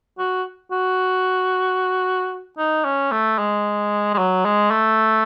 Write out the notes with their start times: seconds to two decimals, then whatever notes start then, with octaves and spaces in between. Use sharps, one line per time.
0.19 F#4
0.72 F#4
2.58 D#4
2.85 C#4
3.12 A3
3.39 G#3
4.14 G#3
4.18 F#3
4.45 G#3
4.71 A3